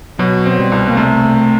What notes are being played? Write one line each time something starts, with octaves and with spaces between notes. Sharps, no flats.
B2 F#3
C4
G3
C2
A#3
C3 A3